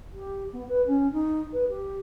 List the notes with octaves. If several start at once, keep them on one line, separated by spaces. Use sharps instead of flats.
G4
B3
B4
C#4
D#4
B4
G4